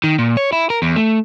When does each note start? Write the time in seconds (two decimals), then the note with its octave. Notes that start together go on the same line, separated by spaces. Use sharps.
0.04 D#3
0.18 A#2
0.37 C#5
0.53 E4
0.70 A#4
0.82 E2
0.96 A3